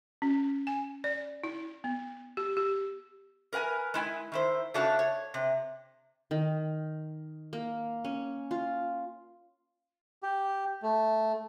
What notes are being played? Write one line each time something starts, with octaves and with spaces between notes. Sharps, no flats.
C#4
G#5
D5
E4
B3
G4
G4
A#4 B4 F#5 G#5
G#3 E4 G#5
D#3 E4 C5
C#3 A3 D4 F#4 C#5 A5
C#5
C3
D#3
A#3
C#4
F4
G4
A3